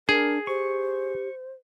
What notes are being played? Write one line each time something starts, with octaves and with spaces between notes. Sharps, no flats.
D4 G#4 A#4
G4 C5 C#6